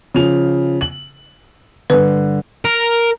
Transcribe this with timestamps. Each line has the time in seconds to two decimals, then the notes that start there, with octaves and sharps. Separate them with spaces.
0.14 C#3 F3 F7
0.81 F#7
1.90 G2 D3 B4
2.65 A#4